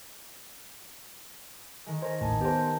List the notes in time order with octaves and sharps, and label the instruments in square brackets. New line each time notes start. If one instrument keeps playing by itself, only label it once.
[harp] D#3 G#3
[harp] A#4 G#5 [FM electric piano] C5
[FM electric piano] A1 D#2 A2 [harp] G#5 A5 D#6
[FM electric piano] B3 C5 [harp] G4 A#4 A5